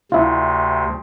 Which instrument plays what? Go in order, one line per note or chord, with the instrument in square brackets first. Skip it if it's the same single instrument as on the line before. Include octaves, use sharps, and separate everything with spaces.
[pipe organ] D2 C3 [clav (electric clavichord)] E4 F4